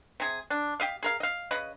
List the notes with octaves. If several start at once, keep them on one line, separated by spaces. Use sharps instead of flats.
C3 G#4
D4
G4 D#5 F5
G#4 A#4 F5
D#5 F5
C#3 B4 D#5